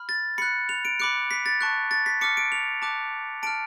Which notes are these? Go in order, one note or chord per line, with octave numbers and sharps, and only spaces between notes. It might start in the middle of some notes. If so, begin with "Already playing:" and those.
Already playing: B5 F6
A6
B5 F#6 C#7
F7
D7
B5 D6 F#6 C#7
B6
A6
A5 C#6 F#6
A6
B6
A5 D6 F6 C#7
D7
F7
A5 D6 F#6
A5 F6 D7